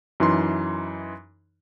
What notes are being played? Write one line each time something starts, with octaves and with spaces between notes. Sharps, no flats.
F#2 E3 D#4 C6